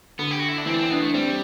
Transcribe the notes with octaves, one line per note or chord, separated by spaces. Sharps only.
D3 B3
G4
F#4
E4
D4
E3 C4
D4
C4
B3 D4
A3
G3 C4